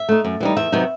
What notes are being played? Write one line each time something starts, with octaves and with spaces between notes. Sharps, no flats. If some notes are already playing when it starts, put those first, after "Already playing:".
Already playing: E5
A3 D#4
F#2
E3 G3 D#4
E2 E5
C3 F#3 B3 D#4